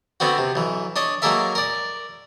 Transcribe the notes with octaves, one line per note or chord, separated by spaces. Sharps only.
D3 B3 C4 F#4
C3
B1 E3
D4 C#5 D#5
F#3 G#3 A#3 A4 A#4 E5
A#4 D5